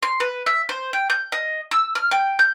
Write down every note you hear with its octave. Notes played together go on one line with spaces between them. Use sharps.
C6
B4
E5
C5
G5
G6
D#5
E6
F6
G5
G6